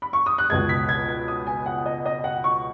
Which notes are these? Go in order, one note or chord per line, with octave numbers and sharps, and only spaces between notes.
B5
C#6
D#6
F#6
C#2 B2 G#3 G#6
B6
G#6
G#6
D#6
G#5
F#5
D#5
D#5
F#5
C#6